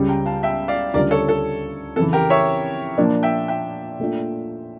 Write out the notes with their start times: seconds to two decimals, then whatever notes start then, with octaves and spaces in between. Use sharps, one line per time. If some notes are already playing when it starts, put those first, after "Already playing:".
Already playing: C#2 C#3 G3
0.09 G5 A#5
0.26 F5 A5
0.43 E5 G5
0.68 D5 F5
0.94 D2 C#3 G3 D4 F4 A#4 D5
1.11 A4 C#5
1.29 A4
1.96 F2 C#3 E3 A4
2.13 G4 A#4
2.30 C#5 E5
2.98 A#2 F3 A#3 D4
3.23 E5 G5
3.48 E5 G5
3.99 A#2 A3 D4 F4